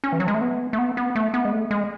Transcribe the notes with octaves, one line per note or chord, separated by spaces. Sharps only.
C#4
E3
F#3
G#3
A3
B3
A3
B3
B3
A3
B3
G#3
A3
G#3